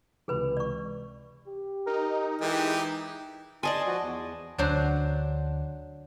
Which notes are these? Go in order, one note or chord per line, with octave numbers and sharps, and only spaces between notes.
C#2 C3 E3 G#4 B4 B5
D5 C#6
G4
D#4 A#4
E3 G#3 G4 G#4
D5 D#5 G#5 A5 C6
F3 F#4
E2
D2 D3 F#3 D4 C5